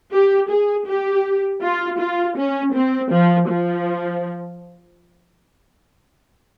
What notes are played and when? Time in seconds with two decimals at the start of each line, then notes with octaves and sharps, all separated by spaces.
0.14 G4
0.50 G#4
0.87 G4
1.63 F4
2.00 F4
2.37 C#4
2.75 C4
3.12 F3
3.49 F3